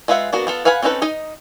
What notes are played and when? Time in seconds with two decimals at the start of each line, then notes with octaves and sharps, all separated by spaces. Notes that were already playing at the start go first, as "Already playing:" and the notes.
0.08 G#3 F4 B4 E5 F#5
0.33 A#3 B3 D4 F#4
0.47 B3 F4 A4
0.65 B4 F5 F#5 G#5 B5
0.83 C4 C#4 D#4 A4 B4
1.02 D#4 D#5 A#5